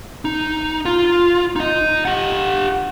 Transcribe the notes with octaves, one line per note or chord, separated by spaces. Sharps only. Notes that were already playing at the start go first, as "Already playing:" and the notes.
D#4
F4
D#4 D#5
G4 F#5